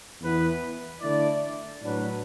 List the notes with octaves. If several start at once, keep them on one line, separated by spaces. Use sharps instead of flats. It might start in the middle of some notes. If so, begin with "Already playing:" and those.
E2 E3 B3 E4 B4
D3 A3 E4 D5
A2 F#3 D4 B4